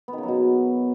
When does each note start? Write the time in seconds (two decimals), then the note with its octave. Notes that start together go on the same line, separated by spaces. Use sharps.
0.08 B3
0.13 D#3
0.18 C#3
0.23 F#3
0.28 B2